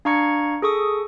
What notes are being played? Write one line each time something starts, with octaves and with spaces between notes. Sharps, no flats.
D4 F5 A#5 C#6 G#6 C#7
G#4 A4 C#6 D#6